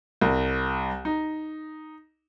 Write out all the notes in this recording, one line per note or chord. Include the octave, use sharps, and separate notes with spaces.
C2
D#4